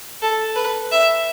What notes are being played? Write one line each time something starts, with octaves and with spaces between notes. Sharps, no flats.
A4
B4
E5